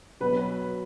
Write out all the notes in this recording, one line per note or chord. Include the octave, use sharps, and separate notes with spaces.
B2 F#3 B4